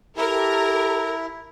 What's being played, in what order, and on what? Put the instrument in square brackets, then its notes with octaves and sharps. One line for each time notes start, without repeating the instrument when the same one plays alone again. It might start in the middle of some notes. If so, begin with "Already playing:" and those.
[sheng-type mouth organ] E4 [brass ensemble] G4 A4 [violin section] A#4